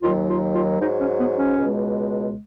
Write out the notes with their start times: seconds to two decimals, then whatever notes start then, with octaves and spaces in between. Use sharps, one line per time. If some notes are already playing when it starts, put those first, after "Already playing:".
0.03 D#2 D#3 F#3 F4
0.29 F4
0.54 F4
0.81 G#2 F#3 D#4
1.00 C#4
1.19 B3
1.39 C#4
1.58 C#2 B2 G#3